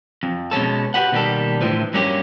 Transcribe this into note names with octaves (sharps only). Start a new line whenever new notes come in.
F2
B2 G#3 C#4 A4
F#4 G4 B4 F#5
B2 D#3 G3 A#3 G4 A4
A2 D3 E3 F3
G2 F#3 A#3 C#4 F#4 G4